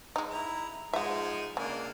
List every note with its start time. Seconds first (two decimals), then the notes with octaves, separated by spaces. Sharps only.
0.16 G#3 D#4
0.30 E4 A#5
0.93 F3 G#3 D#4 E5 F#5
1.57 C#3 A#3 D4